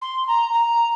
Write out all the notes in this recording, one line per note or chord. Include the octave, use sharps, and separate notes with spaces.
C6
A#5
A#5